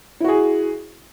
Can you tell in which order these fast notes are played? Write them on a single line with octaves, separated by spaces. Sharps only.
E4 F#4 G#4